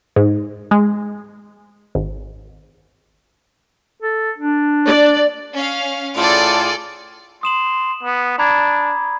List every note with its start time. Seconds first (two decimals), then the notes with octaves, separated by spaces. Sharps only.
0.16 G#2
0.71 G#3
1.95 G#1
4.02 A4
4.38 D4
4.86 D5
5.54 C#4 F5
6.17 A2 F4 G#4 A4 D5
7.43 C6 D#6 E7 F#7
8.03 B3
8.38 D4 A#5 B5 G#6